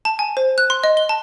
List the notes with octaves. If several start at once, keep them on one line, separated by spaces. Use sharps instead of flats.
A5
G#5
C5
F#6
C6
D#5
G7
A5